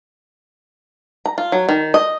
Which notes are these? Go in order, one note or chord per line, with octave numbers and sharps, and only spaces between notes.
A#5
F4
F#3
D#3
D#5